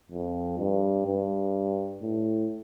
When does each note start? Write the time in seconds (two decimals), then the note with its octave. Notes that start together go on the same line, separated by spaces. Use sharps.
0.11 F2
0.59 G2
1.06 G2
2.02 A2